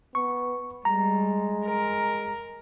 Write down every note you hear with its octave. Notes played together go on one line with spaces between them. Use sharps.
B3 C#6
G3 G#3 A#5
A#4